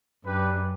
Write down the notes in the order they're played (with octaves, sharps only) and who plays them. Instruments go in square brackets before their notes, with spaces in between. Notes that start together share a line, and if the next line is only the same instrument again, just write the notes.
[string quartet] F#2 [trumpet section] D4 G4 B4